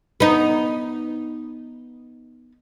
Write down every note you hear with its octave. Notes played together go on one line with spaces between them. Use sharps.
B3 D#4